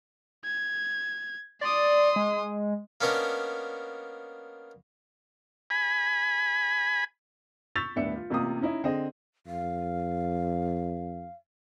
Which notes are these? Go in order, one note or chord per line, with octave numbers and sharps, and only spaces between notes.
G#6
D5 C6 D#6
G#3
A#3 B3 C#4 D4 D#5
G#5 B5
C#6 E6 G6 A6 B6 F7
D#1 A2 B3 D4 E5 C#7
F4
A1 C3 A#3 F4 D#6
C#4 D#4 E4 D#5
D3 C4 G#4 D#5
F2 F5